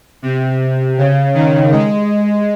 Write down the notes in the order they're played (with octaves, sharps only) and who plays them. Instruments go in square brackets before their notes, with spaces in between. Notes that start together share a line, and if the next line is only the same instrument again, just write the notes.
[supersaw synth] C3
C#3
D#3
G#3